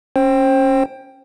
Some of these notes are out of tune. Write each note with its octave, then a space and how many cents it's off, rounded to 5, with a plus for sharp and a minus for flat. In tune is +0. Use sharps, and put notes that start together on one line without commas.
C#4 -10 C5 +25 G5 +0